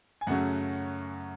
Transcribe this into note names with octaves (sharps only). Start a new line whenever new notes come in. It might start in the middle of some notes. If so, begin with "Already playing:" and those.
G#5
F#2 C#3 F#3 A3 C#4 F#5